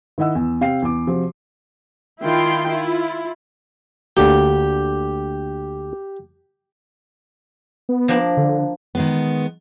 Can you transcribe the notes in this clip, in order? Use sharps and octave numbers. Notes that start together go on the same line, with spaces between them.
D#3 E4 D#5 F#5 E6
E2
C3 F5 G5 C7
E2 D6
C3 F3 F#4
D#3 E4 F4 G5 C6
E4 F4
D2 D3 A#3 G4
B3
F3 A#3 D4
D3
D#3 G#3 B3